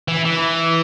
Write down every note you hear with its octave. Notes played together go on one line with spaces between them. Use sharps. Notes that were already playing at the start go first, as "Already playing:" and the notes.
E3
E3